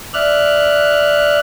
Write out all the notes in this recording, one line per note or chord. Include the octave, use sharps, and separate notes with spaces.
D5 E5 F6 F#6